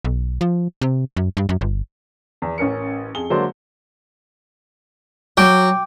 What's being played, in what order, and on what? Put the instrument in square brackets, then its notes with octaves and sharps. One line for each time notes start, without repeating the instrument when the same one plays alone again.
[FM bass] B1
F3
C3
F#2
G2
F#2
G1
[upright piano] E2
A1 C#4 A#4 C#7
F2 G#4 G7
D3 F#3 G#3 A#3 C5 D5
[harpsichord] F#3 [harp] G5 D6 D7